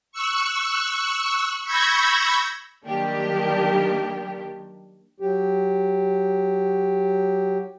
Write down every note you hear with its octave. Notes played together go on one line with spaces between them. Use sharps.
C#6 E6 F#6
B5 C#6 E6 G6 G#6 A#6
D#3 F#3 G3 A#3 D4 G4
F#3 G4